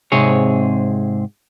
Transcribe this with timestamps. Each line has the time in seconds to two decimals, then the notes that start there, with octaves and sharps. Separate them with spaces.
0.12 G#2 C3 C4 G#4 C#5